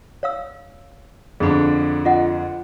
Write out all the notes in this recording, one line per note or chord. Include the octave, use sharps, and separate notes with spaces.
C#5 F5 E6
F2 D3 D4 G#4 B5
F4 D#5 F#5